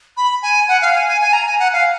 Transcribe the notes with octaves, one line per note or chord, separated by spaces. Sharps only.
B5
G#5
F#5
F5
G#5
G#5
G#5
A#5
G#5
F#5
F5